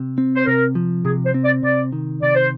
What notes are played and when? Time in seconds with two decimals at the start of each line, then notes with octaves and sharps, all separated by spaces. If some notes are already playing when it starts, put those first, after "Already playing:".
Already playing: C3
0.18 C4
0.35 C5
0.46 C3 A#4
0.75 F3
1.05 C3 G#4
1.25 C5
1.34 C4
1.44 D5
1.63 C3 D5
1.92 D#3
2.21 C3 D5
2.35 C5